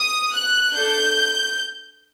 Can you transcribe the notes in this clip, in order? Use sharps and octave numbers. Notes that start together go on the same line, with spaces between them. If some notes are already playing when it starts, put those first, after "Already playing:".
Already playing: D#6
F#6
D4 A4 G6